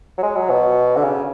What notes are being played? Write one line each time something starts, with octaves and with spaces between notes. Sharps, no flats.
F#3
G#3
F#3
B2
D3
C#3